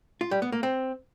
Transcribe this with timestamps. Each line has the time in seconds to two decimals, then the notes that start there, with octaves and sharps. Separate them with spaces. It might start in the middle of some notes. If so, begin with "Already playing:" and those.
0.21 F4
0.31 G3
0.42 B3
0.52 A#3
0.63 C4